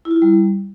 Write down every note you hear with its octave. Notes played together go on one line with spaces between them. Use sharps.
E4
F4
E4
G3